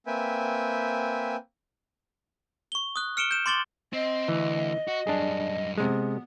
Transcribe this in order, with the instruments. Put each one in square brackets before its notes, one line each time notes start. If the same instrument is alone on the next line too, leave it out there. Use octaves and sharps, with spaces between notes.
[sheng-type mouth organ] A#3 C4 B4 E5 G5 G#5
[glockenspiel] C#6 G7
D#6 F#6
F6 C#7 D7 E7 G7
G6 E7
C6 D6 A6 F#7 G7
[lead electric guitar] C4 [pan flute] D#5
[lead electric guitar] D2 [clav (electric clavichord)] E3
[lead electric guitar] F#4
[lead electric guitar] F#2 G3 [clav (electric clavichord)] D4 G#4
[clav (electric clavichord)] C3 G#3 [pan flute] B3